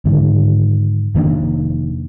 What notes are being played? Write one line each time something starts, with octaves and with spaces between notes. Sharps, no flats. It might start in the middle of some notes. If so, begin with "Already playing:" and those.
G#2 D3 D#3
F1 D#3 A#3 D4